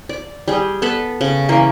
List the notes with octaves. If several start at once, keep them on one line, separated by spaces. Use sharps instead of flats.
D5
G3 G#4
B3 A4 B4
C#3
E3 A#3